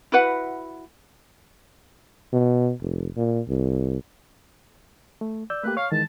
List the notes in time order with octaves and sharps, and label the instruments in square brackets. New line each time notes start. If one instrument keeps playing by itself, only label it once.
[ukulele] E4 F#4 B4 F#5
[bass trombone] B2
F1
A#2
C2
[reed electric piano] A3
D5 E6 G6
[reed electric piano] A3 A#3 G4 [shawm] B4
[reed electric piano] C#5 C#6 F6 [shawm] F5
[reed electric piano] D#3 E3 G#3 [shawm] A5